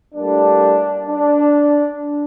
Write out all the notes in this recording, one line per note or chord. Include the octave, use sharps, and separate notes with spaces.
A2 G3 A#3 D4
D4